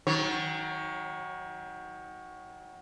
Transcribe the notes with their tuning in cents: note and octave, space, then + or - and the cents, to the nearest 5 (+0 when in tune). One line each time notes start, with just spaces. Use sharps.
D#3 +30 F#3 +0 C#5 -25